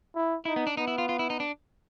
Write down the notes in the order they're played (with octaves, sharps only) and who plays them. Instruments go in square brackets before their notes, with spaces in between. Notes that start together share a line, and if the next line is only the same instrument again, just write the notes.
[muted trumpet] E4
[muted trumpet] D#4 [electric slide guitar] E4
[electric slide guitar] B3
D4
[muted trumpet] B3 [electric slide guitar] D#4
[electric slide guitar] E4
F4
F4
E4
D#4
D4